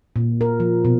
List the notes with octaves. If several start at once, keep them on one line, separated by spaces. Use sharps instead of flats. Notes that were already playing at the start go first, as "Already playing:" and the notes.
A#2
A#4
F3
B2